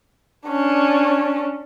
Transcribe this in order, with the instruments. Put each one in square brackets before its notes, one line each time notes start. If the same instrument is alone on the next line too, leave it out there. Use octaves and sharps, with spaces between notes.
[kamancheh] C#4 D4